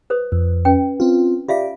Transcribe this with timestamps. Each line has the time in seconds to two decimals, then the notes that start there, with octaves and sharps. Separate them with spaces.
0.10 B4 C5 D#6
0.32 F2
0.65 C#4 B4 G5
1.00 C4 F4
1.48 F4 G4 D5 E5 F5